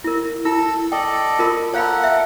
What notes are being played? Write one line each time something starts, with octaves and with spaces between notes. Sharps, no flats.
E4 A#4
E4 A4 E6
A4 D5 D#5 G5
F4 A#4 B5
A4 A#4 C#5 F5 F#5 B5
E5